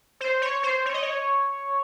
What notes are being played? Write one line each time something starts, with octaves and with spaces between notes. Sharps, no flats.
C5
C#5
C5
C#5
D#5
C#5